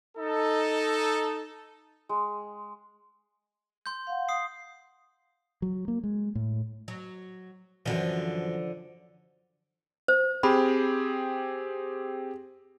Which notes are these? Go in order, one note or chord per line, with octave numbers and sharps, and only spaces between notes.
D#4 A4
G#3
C6 G6
F5 F#5
D#6 C7
F#3
A#3
G#3
A2
F#3
F#2 D3 E3 F3
C5
C4 G4 G#4 B5